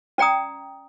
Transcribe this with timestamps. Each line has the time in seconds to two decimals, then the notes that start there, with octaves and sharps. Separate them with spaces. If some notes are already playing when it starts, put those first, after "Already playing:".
0.18 C#4 D5 G5 A#5 D#6